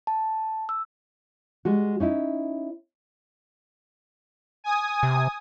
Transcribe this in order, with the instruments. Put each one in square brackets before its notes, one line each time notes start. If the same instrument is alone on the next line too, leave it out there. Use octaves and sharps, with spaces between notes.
[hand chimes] A5
E6
[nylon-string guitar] G3 G#3 F#4
C#4 D#4 E4
[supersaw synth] G#5 D#6
[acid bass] C3